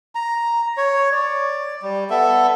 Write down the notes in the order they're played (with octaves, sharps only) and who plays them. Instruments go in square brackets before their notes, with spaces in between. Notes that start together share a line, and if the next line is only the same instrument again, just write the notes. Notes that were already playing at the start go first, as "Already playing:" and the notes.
[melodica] A#5
C#5
D5
G3
B3 A4 E5